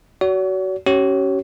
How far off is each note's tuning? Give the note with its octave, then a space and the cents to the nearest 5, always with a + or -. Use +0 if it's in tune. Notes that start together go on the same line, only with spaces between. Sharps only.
F#4 +25 C#5 +45
C#4 +0 G4 -45 C#5 -10